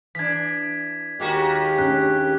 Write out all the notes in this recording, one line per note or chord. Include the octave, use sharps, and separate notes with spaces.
E3 D4 G#6 B6
D#2 G#3 A#3 F#4 G4
C#4 D4 F#6